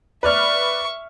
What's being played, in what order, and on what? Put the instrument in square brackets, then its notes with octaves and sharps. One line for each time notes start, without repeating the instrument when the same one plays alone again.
[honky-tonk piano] B4 D5 F6 [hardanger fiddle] E5 C#6